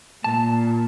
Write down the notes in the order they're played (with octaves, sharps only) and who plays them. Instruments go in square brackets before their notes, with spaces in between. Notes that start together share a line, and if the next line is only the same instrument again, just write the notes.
[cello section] A#2 [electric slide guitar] A5